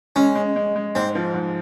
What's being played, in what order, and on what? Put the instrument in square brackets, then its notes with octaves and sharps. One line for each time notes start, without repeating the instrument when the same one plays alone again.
[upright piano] G#3 [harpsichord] C#4
[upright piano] G#3
G#3
G#3
[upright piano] G#2 [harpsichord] C4
[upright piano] F3
G#2